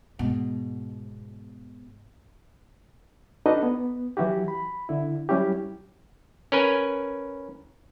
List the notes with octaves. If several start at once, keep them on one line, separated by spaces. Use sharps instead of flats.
G#2 B2
D4 D#4 F#4 A4 B4 D#5
B3
E3 F#3 E4 F#4 G4
B5
D3 E4
F#3 G3 C#4 E4 G4
C#4 A#4 B4 G#5